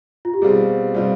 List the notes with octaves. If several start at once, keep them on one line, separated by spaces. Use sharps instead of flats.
F4
G4
B2 G3 C4 F4 G#4
B2 G3 C4 F4